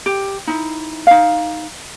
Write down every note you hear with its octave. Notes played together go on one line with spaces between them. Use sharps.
G4
D#4 E4
D#4 F5